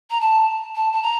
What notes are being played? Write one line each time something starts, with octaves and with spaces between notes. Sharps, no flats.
A#5
A5
A5
A5
A#5